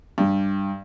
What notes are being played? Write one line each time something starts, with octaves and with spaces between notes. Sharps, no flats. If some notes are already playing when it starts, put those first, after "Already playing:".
G2